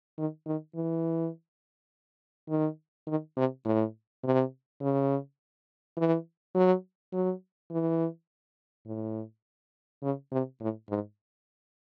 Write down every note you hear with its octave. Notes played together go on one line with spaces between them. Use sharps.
D#3
D#3
E3
D#3
D#3
C3
A2
C3
C#3
E3
F#3
F#3
E3
A2
C#3
C3
A2
G#2